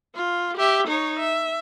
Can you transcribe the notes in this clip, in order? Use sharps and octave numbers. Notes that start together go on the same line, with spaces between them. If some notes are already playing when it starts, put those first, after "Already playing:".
F4
G4 E5
D#4 C#5
E5